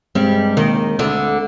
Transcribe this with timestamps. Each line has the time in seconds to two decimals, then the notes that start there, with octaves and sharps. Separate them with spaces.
0.15 G2 G3 G#3 C4
0.57 D#2 D#3
0.99 D2 D3